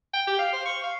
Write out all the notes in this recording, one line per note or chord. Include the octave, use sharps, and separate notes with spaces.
G5
G4
F5
C5
C#6
F5